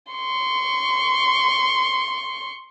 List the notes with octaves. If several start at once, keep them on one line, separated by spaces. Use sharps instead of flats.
C6 C#6